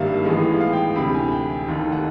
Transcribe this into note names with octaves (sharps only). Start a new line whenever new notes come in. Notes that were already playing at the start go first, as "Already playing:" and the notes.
Already playing: G#1 G2 D#3 G3 A#3 E5 F5
A1 A2 E3 G#3 B3
F5
G5
D2 C3 E3 B5
G#5
G5
F1 D#2 D#3
F#5